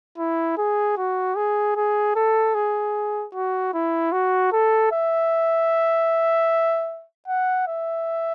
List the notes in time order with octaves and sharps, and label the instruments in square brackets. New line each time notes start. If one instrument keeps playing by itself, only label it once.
[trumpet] E4
G#4
F#4
G#4
G#4
A4
G#4
F#4
E4
F#4
A4
E5
F#5
E5